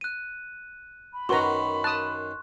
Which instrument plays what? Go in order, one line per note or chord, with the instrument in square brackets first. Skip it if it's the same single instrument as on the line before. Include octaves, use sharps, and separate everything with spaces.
[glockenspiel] F#6 D#7
[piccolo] B5
[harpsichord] F#2 D#3 [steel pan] F#4 B4 A#5 [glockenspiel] C6 C#6
[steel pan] A5 D#6 [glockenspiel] F#6